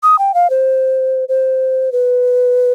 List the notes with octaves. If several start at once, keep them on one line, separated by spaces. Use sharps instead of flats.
D#6
G5
F5
C5
C5
B4